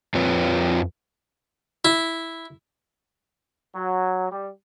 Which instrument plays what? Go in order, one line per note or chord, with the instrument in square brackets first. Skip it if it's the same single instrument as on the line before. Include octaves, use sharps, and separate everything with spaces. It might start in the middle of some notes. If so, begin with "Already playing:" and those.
[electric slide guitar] F2 F3 C4 F4 B4 C#5
[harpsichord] E4
[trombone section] F#3
G3